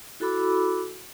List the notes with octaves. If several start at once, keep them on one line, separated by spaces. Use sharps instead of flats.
E4 F#4 A4 B5 D6 E6